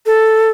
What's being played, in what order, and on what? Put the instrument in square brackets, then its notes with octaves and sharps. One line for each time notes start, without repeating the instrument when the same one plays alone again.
[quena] A4